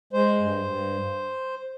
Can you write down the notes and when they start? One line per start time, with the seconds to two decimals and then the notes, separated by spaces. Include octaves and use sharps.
0.13 G#3 C5
0.38 G2
0.64 G2